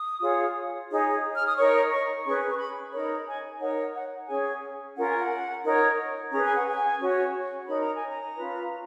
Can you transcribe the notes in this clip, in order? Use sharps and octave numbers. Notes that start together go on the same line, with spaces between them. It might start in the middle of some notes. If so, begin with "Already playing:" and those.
Already playing: D#6
F4 G#4 C#5
D#4 G#4 C#5
F6
D#6
D#4 A#4 C#5 C#6
C#6
C#4 G#4 B4 C#6
C#6
B5
D#4 A#4 C#5 B5
G#5
D#4 A#4 C#5 F#5
F#5
C#4 G#4 C#5 G#5
C#4 F4 A#4 F#5
G#5
F#5
D#4 A#4 C#5
C#4 G#4 B4 A#5
G#5
F#5
G#5
C#4 F#4 C#5
D#4 A#4 C#5 B5
A#5
G#5
A#5
C#4 F4 B4